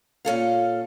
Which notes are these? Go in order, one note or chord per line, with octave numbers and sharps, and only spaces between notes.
A#2 C#4 A4 F5